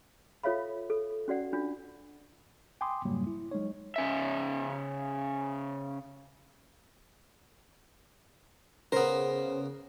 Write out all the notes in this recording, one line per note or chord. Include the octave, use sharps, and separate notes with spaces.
F4 A4 C#5 E5 F5 B5
A4
C#4 F#4 D5 F#5
C#4 D4 F4
G5 G#5 B5 C6 D6 D#6
F2 G#2 C#3 F#3 G3 A#3
E4
F#3 G#3 D#4 C#5
C#3 C#4 E5
C#3 B3 A#4 C5